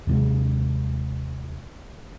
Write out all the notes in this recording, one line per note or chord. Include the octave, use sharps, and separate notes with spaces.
D#2 C3 G#3